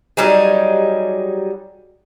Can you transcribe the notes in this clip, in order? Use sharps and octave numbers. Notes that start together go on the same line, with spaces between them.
F#3 G3 D#4 G#4